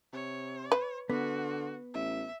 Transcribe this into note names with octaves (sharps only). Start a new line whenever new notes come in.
C3 C#5
B4
D3 B3 F#4
A1 E5